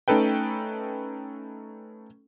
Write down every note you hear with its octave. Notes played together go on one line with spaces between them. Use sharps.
A3 C#4 D#4 A4 B4 G5